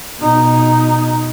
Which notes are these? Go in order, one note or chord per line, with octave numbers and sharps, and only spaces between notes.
B2 D#4